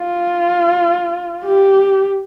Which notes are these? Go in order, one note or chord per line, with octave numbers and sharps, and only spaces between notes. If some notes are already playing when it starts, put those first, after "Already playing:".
Already playing: F4
G4